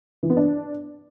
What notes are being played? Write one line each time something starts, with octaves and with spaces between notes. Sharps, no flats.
E3
B3
D4